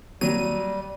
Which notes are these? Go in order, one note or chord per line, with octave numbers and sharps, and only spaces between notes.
D#2 F#3 G3 D#7